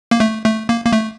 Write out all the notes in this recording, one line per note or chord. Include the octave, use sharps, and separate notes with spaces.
A#3
A3
A3
A#3
A#3
A3